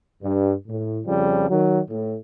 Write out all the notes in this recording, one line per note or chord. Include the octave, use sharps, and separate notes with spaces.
G2
A2
F2 C#3 F3 G3
D#3 F#3
A2